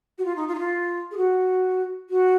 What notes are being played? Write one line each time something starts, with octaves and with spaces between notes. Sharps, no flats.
F#4
F4
D#4
F4
D#4
F4
G#4
F#4
F#4